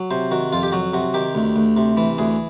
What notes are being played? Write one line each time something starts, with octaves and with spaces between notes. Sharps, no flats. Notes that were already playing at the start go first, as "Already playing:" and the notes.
Already playing: F#3
C3 C5
D#3 F#4
F2 F4
G4
F#3 F#4
C3 F#4
D#3 G4
D2
D2
C3
E3
D2 G#4